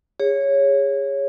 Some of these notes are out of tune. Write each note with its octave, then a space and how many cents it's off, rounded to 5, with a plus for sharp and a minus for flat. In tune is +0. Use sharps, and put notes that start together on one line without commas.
G#4 -25 C#5 +0